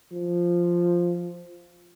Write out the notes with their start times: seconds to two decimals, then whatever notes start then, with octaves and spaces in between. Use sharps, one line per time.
0.12 F3